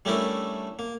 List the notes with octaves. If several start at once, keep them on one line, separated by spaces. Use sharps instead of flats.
G3 A3 C#4 D4 E4 A#4
A#3